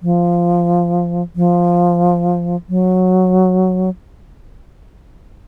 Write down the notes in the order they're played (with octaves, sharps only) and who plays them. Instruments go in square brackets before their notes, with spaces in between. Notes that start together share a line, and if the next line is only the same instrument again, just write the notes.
[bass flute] F3
F3
F#3